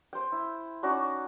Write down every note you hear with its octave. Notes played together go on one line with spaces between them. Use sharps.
C5 G5
E4
C#4 D#4 F#4 D5